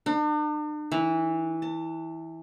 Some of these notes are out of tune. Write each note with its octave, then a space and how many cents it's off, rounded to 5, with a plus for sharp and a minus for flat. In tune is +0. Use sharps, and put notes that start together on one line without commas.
D4 +45
E3 -15
A5 +30